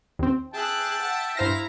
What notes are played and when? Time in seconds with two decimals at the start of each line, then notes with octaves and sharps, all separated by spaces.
0.19 D#2 C4
0.54 G#4 E5 G5 A5 F#6
1.01 F#5
1.37 G2 E4 C5 F5 A#5 A#6